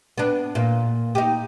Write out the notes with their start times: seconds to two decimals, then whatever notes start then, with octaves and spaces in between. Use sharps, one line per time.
0.18 B3 D4
0.55 A#2
1.15 D#4 G4